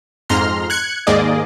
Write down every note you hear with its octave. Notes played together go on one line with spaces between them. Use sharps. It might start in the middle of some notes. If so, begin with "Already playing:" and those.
F2 G#2 A#5 C6 F6
F#6 G#6 C#7
D#2 G#2 A#3 G#4 D5 D#5